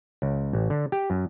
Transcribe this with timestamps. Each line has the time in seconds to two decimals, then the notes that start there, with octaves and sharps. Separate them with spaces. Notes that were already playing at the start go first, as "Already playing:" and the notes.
0.22 C#2
0.53 A1
0.70 D3
0.92 G4
1.10 F#2